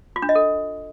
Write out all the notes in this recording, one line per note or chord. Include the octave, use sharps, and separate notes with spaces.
F4
D4
D#5
A4